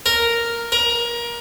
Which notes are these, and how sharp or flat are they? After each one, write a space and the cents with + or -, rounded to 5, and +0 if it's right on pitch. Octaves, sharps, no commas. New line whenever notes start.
A#4 +0
A#4 +25